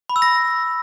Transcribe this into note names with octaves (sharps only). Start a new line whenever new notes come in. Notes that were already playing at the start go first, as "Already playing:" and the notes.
B5
E6
A#6